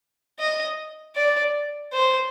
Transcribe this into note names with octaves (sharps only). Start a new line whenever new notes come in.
D#5
D5
C5